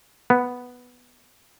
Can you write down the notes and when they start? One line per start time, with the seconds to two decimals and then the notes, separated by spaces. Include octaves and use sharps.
0.30 B3